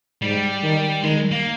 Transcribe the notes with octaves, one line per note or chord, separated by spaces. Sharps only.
G#2 G3
D#3
D#3 G#3
A#3